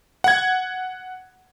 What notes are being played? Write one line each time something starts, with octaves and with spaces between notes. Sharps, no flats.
F#5 G#6